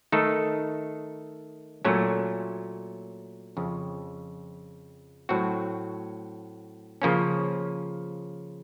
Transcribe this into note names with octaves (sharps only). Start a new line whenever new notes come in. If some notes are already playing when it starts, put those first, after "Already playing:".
D#3 A3 D#4 A4
A#2 F#3 A3 C#4
F2 C#3 F3
A2 F#3 C4 F#4
C#3 F3 A#3 C#4